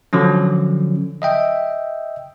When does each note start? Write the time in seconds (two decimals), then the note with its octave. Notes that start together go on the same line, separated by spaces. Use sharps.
0.13 D3 F3 F#3 C#4
1.22 D#5 E5 G5